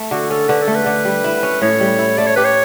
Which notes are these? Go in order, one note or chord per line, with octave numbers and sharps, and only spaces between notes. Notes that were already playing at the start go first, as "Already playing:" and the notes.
Already playing: A3
D3 F#4
C#4 A4
D3 B4
A4
A3
B4
D3
G3
E4
C#4
A2 C#5
G3
E4
A3 D5
C#5
G4 B4
C#5